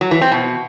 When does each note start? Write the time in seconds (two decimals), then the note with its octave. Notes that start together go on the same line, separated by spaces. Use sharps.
0.01 F#3
0.11 E3
0.21 C4
0.32 B2